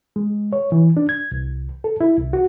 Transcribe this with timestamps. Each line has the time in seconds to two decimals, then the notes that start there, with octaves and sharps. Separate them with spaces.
0.16 G#3
0.53 C#5
0.72 E3
0.97 D4
1.09 G#6
1.32 C2
1.84 A4
2.01 E4
2.18 C2
2.33 F#4